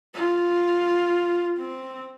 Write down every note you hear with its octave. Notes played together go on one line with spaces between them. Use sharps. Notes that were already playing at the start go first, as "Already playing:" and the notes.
F4
C4